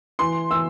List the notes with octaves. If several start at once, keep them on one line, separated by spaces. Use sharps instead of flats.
E3 C6
E3 E6